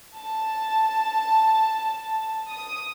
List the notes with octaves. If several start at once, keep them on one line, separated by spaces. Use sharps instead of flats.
A5
D#6